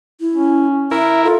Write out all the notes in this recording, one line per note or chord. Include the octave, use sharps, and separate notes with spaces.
E4
C#4
E4 A#4 E5
F4 A4